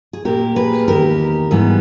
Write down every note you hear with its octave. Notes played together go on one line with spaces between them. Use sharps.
G#4
A#2 A#3 G4 A#4
G#4 B4
E2 D#3 A#3 G4 A#4
G#2 E3 G3 B3